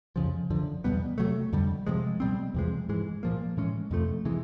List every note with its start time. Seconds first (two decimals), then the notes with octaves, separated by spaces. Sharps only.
0.16 F2 C#3 F3
0.50 F#2 D3 F3
0.84 E2 B2 G3 B3
1.18 C3 D#3 F#3 A3
1.53 F2 D3 G3
1.87 C3 F3 G#3
2.20 B2 G3 C4
2.54 E2 C3 F3 G#3
2.89 G#2 E3 G#3
3.23 A#2 F3 A#3
3.57 A2 E3 G#3 C#4
3.91 F2 C3 F3 A3
4.25 C3 E3 G#3